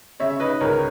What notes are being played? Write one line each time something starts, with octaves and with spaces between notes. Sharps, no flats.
C#3 C#5 E5
D#4 B4 D#5
C#2 A#4 C#5